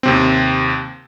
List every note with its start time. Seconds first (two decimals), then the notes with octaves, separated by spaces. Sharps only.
0.03 D#2 C3 C4